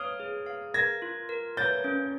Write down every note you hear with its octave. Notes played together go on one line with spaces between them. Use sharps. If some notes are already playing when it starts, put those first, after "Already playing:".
Already playing: C#5 F5 D#6 F6
G#4
F5
A#4 G#6 A#6
F4
A#4
C#5 G6 A6
C#4